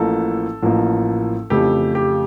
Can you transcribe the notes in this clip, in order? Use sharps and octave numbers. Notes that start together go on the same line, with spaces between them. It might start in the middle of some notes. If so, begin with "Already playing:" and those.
Already playing: A1 A2 F3 A#3 A4
A1 A2 F3 A#3
F2 C#3 E3 A3 G4
G4